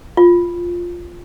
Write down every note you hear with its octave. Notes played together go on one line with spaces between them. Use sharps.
F4